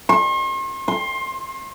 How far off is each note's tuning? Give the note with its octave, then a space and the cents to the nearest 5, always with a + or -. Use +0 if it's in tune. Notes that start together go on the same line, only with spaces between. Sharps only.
C6 +45
C6 +20